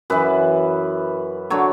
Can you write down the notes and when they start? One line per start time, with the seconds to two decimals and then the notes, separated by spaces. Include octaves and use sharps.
0.10 F#2 E3 B4
1.50 D3 F#3 C#5